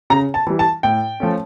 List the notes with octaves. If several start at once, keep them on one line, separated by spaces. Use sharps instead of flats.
C#3 A#5
A5
E3 G3
A5
A2 G5
F3 A3 C#4